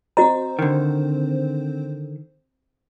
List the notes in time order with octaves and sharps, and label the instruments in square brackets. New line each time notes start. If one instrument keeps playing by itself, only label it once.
[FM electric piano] C4 C5 [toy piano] F#4 D#5 A#5
[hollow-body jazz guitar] D3 D#3